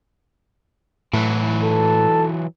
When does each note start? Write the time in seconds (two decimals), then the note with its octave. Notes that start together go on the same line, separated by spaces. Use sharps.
1.13 A2 E3 F#3
1.63 A4